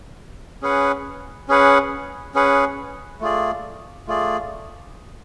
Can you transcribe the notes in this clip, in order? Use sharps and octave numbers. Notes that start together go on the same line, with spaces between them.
C#4 G#4 B4 F#5
C#4 G#4 B4 F#5
C#4 G#4 B4 F#5
A3 F4 G#4 D5
A3 F4 G#4 D5